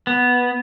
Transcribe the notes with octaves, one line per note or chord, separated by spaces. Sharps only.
B3